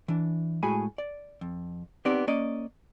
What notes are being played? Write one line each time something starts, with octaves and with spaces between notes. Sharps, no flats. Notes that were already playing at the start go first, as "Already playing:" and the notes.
E3 D4
A2 G#3 F#4 G#4 G#5 B5
D5
F2
B3 C4 D#4 G4 D5
A#3 C#4 D5 D#5